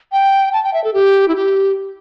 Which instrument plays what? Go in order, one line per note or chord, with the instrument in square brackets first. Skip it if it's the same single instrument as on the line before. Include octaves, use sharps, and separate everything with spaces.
[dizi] G5
A5
G5
E5
A4
G4
E4
G4